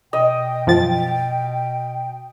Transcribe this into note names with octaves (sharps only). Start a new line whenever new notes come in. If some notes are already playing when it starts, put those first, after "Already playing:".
B2 D#5 G5
F#2 F3 A6